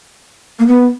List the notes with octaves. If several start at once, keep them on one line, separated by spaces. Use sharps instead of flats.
A#3
B3